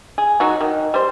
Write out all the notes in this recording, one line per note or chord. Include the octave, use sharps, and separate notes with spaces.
G#4
F#3 D#4 F#4
D#3
G3 C5